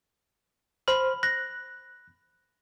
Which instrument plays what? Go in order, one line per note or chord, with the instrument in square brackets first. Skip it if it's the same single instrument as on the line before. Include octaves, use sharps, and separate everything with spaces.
[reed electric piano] C5 F6 [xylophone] B5
[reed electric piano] F#6 [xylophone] A#6